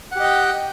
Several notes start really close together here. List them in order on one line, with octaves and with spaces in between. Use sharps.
F#5 G4 D#5 G5